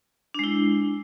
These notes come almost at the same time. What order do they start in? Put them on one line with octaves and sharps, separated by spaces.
D4 G#3 E4